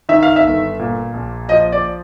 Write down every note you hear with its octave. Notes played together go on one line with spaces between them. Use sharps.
D#3 E5
F5
E5
G1
A#2
A#1
F3 D#5
D5